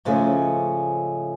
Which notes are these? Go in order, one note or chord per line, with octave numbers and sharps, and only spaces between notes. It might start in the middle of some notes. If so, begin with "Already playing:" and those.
G#2 C#3 F3 G#3 A3 C#4